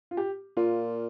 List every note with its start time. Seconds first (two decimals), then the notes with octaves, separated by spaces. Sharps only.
0.11 F4
0.17 G4
0.57 A#2 F4